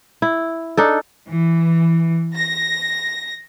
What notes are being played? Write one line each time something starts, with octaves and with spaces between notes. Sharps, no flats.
E4
D4 D#4 A4
E3
A#6